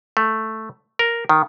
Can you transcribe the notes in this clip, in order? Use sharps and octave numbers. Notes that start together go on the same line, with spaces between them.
A3
A#4
D#3